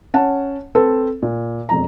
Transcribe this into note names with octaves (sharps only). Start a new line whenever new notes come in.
C#4 C#5 F#5 A5
C4 A4 B4
A#2
E1 F2 A#5